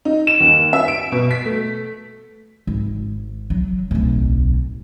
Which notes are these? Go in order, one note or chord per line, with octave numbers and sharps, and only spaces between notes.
D#4
E7
D#2
E5
D7
B2
B6
A3
G#1
F#3
D1 B1